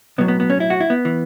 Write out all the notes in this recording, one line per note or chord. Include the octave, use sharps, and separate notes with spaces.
B1 A2 F#3 B3
B3
B3
C#4
E4
F#4
E4
B3
E3